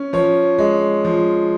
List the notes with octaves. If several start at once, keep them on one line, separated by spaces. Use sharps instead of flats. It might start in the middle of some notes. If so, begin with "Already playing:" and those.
Already playing: C#4
F3 C#5
G#3
F3